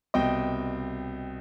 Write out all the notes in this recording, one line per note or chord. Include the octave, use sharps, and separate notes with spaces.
C2 B2 D#5 G5